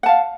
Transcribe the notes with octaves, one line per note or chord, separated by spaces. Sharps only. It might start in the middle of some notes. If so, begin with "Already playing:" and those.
F5 F#5 A5